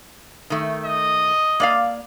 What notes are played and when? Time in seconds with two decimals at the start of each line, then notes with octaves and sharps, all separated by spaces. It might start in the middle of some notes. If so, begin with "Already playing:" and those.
0.50 D#3 A3
0.84 D#5
1.60 A#3 D5 F5